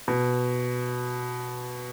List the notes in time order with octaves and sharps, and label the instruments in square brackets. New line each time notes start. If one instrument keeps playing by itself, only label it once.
[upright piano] B2